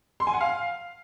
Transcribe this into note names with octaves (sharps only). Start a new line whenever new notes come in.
C6
G#5
F#5
F5